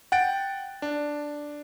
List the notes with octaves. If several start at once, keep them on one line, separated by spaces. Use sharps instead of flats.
F#5 G5 A6 D7
D4